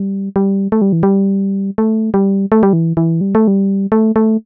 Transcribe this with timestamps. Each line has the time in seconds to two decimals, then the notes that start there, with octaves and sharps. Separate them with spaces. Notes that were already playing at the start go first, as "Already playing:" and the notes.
Already playing: G3
0.36 G3
0.72 A3
0.82 G3
0.93 E3
1.03 G3
1.78 A3
2.14 G3
2.52 A3
2.63 G3
2.73 E3
2.97 E3
3.21 G3
3.35 A3
3.48 G3
3.92 A3
4.16 A3